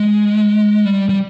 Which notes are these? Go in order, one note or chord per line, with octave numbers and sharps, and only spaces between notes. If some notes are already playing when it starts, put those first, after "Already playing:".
Already playing: G#3
G3
G3